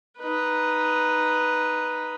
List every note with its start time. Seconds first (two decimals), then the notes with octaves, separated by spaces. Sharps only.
0.19 D#4 B4